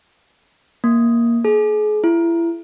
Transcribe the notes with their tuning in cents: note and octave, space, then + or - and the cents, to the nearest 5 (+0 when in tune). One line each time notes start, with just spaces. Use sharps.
A#3 +5
G#4 +35
E4 +30